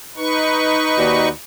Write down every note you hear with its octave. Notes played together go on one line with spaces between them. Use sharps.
D#4 B4 C#6
D#2 F#4 D5